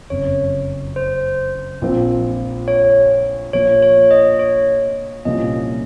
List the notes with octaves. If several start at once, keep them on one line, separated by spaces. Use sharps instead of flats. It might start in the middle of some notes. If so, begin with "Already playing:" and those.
F#1 F2 C#3 C#5
C5
A#1 A#2 F3 C4
C#5
A#2 F3 A#3 C#5
C#5
D#5
C#5
C2 A#2 F3 A#3 C#4 D#5